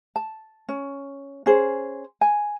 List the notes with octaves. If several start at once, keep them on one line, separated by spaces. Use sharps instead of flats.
A5
C#4
C#4 G#4 C5
G#5